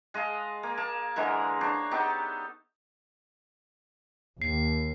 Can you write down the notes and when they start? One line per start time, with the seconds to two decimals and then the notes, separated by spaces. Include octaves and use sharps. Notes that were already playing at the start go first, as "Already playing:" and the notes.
0.14 G#3 D#5 F5 A5
0.63 A#3
0.77 A#3 A5
1.16 D3 E3 G#3 A#4
1.61 D4 C5 C#5
1.91 B3 D#4 G4 A4
4.42 D#2 C7